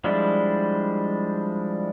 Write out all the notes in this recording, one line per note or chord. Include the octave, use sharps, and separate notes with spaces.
F3 G3 G#3 D4 E4